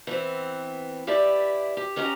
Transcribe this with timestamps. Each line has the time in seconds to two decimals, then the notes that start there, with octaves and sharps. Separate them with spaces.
0.07 E3 B3 C4
1.07 E4 G4 B4 D5 E5
1.77 G4
1.96 B3 C#4 G4 D#5 G#5 A#5